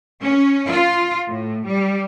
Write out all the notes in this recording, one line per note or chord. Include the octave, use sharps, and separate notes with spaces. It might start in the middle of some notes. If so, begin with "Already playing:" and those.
C#4
F4
A2
G3